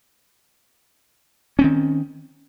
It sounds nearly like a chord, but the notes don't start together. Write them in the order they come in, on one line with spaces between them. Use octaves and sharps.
C#4 C4 D#3